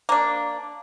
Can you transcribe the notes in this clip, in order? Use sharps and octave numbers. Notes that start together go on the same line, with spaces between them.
A#3 D4